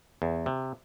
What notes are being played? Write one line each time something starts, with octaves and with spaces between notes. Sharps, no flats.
E2
C3